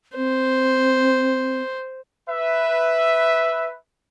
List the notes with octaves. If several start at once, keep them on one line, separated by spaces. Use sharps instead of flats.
C4 C5
B4 E5